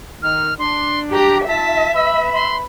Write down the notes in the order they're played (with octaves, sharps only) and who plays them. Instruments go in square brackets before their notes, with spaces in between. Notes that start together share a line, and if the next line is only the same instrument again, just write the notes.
[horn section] D#3 D#4 [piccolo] F6
[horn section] D4 [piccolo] C6
[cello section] G4 [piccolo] A#5
[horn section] D#4 F4 A5 [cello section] E5 [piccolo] B6
[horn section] B4 B5 [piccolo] E6
[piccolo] C6